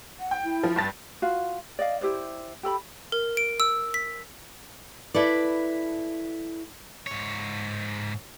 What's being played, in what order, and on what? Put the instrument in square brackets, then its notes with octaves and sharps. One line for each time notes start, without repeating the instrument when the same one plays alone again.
[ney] F#5
[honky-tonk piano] G5
[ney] E4
[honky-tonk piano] F3
G2 A5 A6
[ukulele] F4 F#4 F5
D5 D#5 F5
E4 G4 C5 D5
G4 A4 B5
[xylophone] A#4
D7
E6
B6
[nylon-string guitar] E4 A4 B4 D5
[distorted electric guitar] G#2 C#5